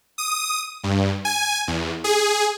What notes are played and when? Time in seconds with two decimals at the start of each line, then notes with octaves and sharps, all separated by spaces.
0.18 D#6
0.84 G2
1.25 G#5
1.68 E2
2.04 G#4